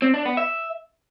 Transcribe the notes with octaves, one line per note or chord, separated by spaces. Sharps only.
C4
D4
B3
E5